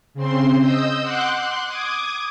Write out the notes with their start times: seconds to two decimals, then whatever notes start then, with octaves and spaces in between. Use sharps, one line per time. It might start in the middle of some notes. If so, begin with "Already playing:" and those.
0.14 C#3 C4 C6
0.60 D#5 D#6 E6 G6
1.02 F#5 C6 D6 F#6 G6
1.35 C6 F#6
1.66 D6 D#6 G#6